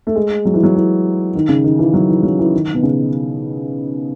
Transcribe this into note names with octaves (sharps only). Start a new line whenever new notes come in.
A3
G#3
F#3
E3
F#3
E3
D#3
C#3
D#3
E3
F#3
E3
F#3
E3
D#3
B2
C#3